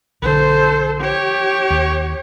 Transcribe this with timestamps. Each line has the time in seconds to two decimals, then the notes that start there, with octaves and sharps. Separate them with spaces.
0.22 B1 D3 A4 C5
1.00 G4 C#5
1.70 D#2